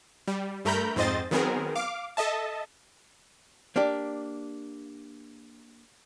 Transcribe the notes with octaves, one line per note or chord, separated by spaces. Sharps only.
G3
G2 A3 A#4 A#5 B5 G6
F2 G#2 C4 C5 D#5 A6
D#3 F#3 B3 C4 G#4 A#4
F5 D6
A4 D#5 E5 A5
A#3 D4 G4 D5